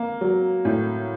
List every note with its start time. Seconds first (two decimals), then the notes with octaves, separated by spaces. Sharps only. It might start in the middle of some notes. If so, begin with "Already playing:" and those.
Already playing: A#3
0.21 F#3
0.65 A2